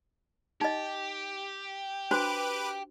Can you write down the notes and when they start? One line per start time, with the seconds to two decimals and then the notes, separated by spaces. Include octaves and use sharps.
0.61 D#4 G4 D#5
2.11 D4 F#4 B4 C5 D6